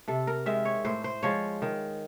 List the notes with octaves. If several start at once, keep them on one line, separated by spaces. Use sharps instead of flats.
C3 A4
A#4
D#3 G#3 E5
C#5
A2 C5
C5
F3 G#3 C#5
D#3